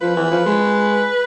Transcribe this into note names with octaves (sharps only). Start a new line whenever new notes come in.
F3 B4
E3
F3
G#3